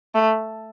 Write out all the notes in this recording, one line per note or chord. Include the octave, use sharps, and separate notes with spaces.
A3